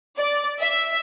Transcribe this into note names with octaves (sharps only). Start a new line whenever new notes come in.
D5
E5